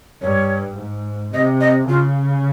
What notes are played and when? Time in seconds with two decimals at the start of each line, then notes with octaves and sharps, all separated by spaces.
0.22 G2 C#5
0.77 G#2
1.34 C3 D#5
1.61 D#5
1.89 C#3 F4